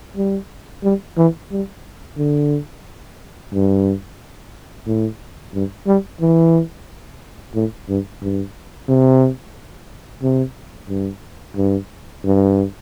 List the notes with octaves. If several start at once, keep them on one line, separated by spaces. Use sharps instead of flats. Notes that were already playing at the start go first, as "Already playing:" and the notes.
G3
G3
E3
G3
D3
G2
A2
G2
G3
E3
A2
G2
G2
C3
C3
G2
G2
G2